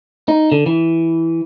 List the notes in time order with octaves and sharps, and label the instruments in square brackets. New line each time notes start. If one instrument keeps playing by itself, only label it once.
[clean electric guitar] D#4
D3
E3